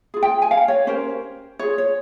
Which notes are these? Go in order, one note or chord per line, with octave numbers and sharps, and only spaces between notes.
F4 G#4
G5
G#5
F5
C#5
C#4 G4 A#4 C5
F4 G#4 C#5
C#5